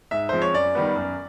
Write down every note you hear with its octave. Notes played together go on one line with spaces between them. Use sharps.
G#2 E5
F3 G#3 C4 C5
C#5
F#2 D5
D#3 G3 B3
F#2